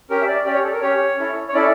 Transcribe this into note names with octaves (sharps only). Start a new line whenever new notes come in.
C#4 G4 A#4
E5
D5
C#4 G4 D5
C#5
A4
A#4
C#4 G4 C#5
C#4 E4 A4
C#5
C#4 E4 A4 D5